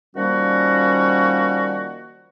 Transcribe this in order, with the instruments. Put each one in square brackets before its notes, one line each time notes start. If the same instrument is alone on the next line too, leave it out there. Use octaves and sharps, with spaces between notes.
[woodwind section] D#3 F3 G3 A#3 C#4 F#4